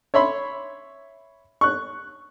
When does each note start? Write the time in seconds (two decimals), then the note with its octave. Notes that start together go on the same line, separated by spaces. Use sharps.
0.14 C#5 E5 B5 C6
1.61 C#6 F#6